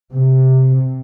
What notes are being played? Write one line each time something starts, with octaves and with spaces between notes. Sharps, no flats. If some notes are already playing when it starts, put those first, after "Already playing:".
C3